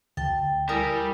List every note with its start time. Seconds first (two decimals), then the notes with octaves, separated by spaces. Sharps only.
0.17 D2 G5 A5
0.69 G3 E4 A#4 G#5 D#6